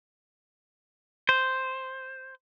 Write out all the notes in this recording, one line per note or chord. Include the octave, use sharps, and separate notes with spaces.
C5